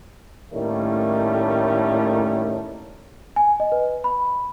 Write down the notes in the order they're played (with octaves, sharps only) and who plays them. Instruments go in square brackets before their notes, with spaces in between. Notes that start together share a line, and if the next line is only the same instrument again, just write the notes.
[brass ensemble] A2 D#3 G3 A3 A#3 C#4
[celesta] G#5
D#5
B4
B5